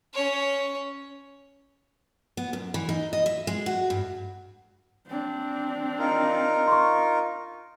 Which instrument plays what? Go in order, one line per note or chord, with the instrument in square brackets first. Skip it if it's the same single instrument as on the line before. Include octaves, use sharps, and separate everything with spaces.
[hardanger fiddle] C#4 C#5
[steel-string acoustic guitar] B3
F#2
E3
D#4
D#5
E5
G#3
F#4
G2
[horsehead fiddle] C4 D4
[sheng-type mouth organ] D#4 F4 A#4
[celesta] C6 C#6